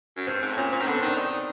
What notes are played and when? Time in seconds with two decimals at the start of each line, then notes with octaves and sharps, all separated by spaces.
0.16 F#2
0.27 G2 C4
0.42 G#2
0.51 A2
0.57 A#2 C#4
0.72 A#2 C4
0.81 D#3
0.87 D3 B3
0.97 C4
1.02 D#3
1.07 D4
1.17 D#3 D#4